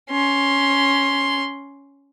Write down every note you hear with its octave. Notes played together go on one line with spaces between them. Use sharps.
C#4 C6